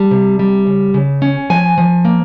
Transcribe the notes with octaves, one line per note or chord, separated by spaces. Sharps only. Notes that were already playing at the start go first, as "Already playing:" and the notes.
Already playing: G3 A5
C3
G3
C#3
C#3
C#4
F3 G#5
F3
A#3